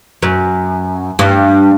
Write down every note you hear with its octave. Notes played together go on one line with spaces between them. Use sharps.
F#2
G2